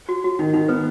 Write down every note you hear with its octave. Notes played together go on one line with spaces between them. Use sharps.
F#4
F#4
D#3 D#4
D#3 D#4
B3 B4